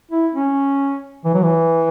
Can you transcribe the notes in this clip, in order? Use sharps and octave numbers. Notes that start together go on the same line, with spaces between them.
E4
C#4
E3
F#3
E3